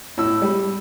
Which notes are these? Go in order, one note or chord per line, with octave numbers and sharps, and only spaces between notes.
A2 E6
G3